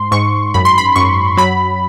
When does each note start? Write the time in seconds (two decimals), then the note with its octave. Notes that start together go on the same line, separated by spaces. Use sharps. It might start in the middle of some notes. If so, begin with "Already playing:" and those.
Already playing: G#2 C6
0.12 G#2 C#6
0.54 F#2 B5
0.65 C6
0.78 B5
0.96 F#2 C#6
1.37 F#3 B5